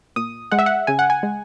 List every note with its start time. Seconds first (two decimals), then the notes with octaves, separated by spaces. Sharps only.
0.16 A#2 D#6
0.51 G#3 F#5
0.59 E5
0.66 F#5
0.87 C#3 G#5
0.99 F#5
1.10 G#5
1.23 G#3